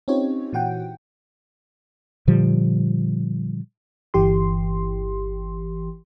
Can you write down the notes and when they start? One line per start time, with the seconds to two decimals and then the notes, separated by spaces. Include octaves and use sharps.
0.08 C4 C#4 D#4 F4 G4 C#5
0.53 A#2 E3 F#4 F#5 G5
2.27 A#2 D3 F3 G3
4.14 G1 E3 G4 C6